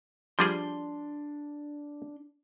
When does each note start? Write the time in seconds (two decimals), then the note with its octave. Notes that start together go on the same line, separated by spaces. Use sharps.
0.39 F3 G3 D4 G#4 C6